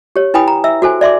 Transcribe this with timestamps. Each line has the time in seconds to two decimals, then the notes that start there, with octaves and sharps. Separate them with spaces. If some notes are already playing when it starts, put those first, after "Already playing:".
0.16 G4 C#5
0.34 E4 B4 G5 G#5 B5 D#6
0.48 A#5
0.64 E5 E6
0.82 F#4 A4 C5 G#5
1.01 D5 E5 C6 D6